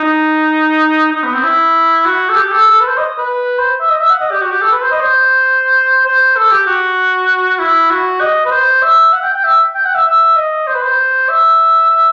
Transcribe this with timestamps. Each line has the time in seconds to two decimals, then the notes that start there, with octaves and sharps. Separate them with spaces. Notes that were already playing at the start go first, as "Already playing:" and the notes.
Already playing: D#4
1.13 D#4
1.23 B3
1.34 C4
1.44 E4
2.05 F#4
2.29 A4
2.36 G4
2.52 A4
2.67 A4
2.81 B4
2.88 C5
2.98 D#5
3.18 B4
3.59 C5
3.80 E5
3.90 D#5
4.00 E5
4.10 F#5
4.20 D#5
4.31 G4
4.41 F#4
4.51 G4
4.62 A4
4.72 B4
4.82 C5
4.92 D#5
5.01 C5
6.05 C5
6.36 A4
6.51 G4
6.67 F#4
7.59 E4
7.90 F#4
8.20 D#5
8.45 B4
8.51 C5
8.82 E5
9.13 F#5
9.23 G5
9.34 G5
9.44 E5
9.75 G5
9.85 F#5
9.95 E5
10.06 E5
10.37 D#5
10.67 C5
10.75 B4
10.83 C5
11.29 E5
11.90 E5